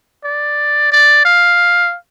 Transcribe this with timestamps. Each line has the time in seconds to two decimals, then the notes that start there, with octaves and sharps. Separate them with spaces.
0.24 D5
0.92 D5
1.25 F5